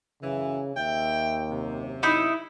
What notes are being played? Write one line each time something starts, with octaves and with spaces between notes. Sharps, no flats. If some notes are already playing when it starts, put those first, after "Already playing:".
F#2 C#3 E3
D#2 E5 G5
F#2 C3
D#4 E4